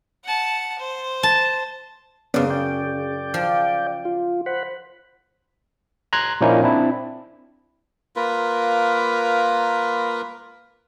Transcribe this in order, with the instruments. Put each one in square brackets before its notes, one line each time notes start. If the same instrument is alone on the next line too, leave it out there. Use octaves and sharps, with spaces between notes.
[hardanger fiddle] F#5 A5
C5
[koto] A5
[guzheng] F#2 C#3 [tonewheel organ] B3 C#4 D5
[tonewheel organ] D5 G5
[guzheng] F3
[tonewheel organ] F4
C5 F#5 B5
[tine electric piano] A#5 C6 F#6 G#6
A#2 F3 A#3 C#4 D#4 E4
C4 D4 E4
[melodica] A#3 F4 A#4 B4